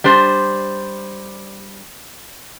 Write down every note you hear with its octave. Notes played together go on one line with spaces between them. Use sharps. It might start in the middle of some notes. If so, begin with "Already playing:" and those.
G3 D4 C5